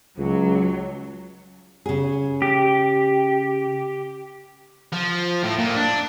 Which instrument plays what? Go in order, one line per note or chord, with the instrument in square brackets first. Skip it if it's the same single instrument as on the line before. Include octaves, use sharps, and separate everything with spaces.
[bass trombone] C#2 [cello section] F#3
[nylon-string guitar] C#3 G#4
[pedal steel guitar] G4
[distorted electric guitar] F3
A2
A#2
D4